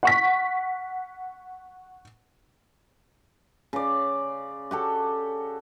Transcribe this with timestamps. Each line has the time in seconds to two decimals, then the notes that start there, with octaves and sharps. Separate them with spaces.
0.03 F#5 C#6 B6
3.73 C#3 D5
4.71 F#4 G4 A4